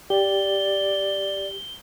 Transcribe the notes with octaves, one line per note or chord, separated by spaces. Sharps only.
G4 D5 G7